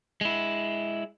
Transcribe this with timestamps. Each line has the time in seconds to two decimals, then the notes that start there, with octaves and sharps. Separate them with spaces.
0.21 G#3 E4